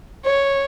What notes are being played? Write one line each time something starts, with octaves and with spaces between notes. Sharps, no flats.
C#5